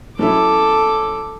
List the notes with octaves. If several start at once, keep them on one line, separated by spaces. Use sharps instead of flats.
F#3 C#4 E4 A4 D6